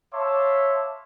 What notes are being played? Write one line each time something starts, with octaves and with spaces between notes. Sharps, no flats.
C#5 E5 F5 A5 C6 D6